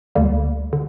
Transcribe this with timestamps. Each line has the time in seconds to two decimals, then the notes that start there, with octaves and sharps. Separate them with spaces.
0.15 D2 D3 G3 A#3
0.73 D3